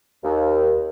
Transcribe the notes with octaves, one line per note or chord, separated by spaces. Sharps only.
D#2